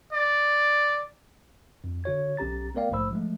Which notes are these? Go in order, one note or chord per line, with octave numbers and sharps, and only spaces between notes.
D5
F2
D3 F#4 C#5 G#6
B1 C#4 G4 A#5 A6
A3 B3 A#4 D5 F5 G5
A#1 G#2 A3 C5 B5 E6
F3 G#3 A3